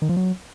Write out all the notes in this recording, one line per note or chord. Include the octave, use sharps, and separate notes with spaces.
D#3
F3
F#3